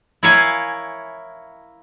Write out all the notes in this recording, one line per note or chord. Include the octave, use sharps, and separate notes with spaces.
E4 A#4 C#5 F5 G#5